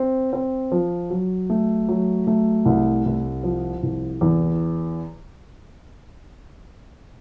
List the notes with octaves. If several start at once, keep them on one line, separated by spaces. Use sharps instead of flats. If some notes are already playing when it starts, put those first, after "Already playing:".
Already playing: C4
C4
F3
F#3
A3
F#3
A3
C2
C2
F3
C2
E2